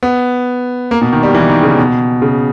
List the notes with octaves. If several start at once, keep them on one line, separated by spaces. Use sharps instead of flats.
B3
A#3
B2
D#3
G3
E3
D#3
C#3
B2
C#3